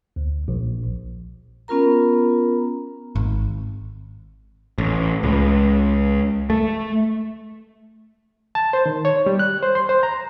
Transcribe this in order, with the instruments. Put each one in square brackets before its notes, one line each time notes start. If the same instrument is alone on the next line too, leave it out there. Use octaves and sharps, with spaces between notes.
[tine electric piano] D2
A#1
[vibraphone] B3 C#4 F4 A#4 A#5
[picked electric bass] G#1
A1
C#2
A3
[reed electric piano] A5
C5
D#3
C#5
G3
F#6
C5
C6
C5
A#5